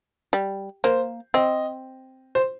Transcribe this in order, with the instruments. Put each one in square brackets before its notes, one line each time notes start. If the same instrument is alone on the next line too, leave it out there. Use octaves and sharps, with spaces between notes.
[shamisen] G3
[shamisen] A#3 [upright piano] C5
[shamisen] C4 [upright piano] D#5
[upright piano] C5